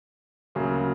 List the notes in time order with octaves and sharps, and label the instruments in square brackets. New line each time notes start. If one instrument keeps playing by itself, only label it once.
[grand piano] D2 C#3 F#3 A#3